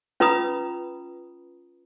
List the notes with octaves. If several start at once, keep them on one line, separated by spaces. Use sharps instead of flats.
C#4 F4 B4 A#5 B5 D#6